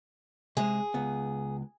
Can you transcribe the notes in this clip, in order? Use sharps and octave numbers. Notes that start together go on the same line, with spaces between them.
C3 G#3 G#4
C#2 B3